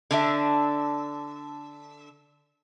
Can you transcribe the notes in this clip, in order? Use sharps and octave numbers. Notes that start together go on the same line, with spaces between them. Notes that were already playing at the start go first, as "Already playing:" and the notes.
D3 D4 E5